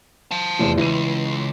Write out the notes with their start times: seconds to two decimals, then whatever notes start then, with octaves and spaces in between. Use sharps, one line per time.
0.31 F5 A5
0.59 F1 E2
0.77 C#2 E3 D#7